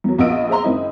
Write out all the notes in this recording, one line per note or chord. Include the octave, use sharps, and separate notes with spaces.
E2 F#3
A#1 B3 F4 D#5 E6 D7
G#4 C5 E5 A#5 C6
F#1 D#3 C4 E4 D#5